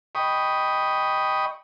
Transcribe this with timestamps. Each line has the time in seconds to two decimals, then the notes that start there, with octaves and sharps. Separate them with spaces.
0.15 D#5 G5 B5 C#6 D#6